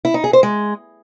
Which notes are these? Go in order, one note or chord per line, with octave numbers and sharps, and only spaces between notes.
E4
D#4
G#4
C5
G#3